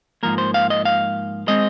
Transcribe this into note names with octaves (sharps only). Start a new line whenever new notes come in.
G#2 F3 A#3 A#4
C5
F5
D#5
F5
G#3 C4 D#5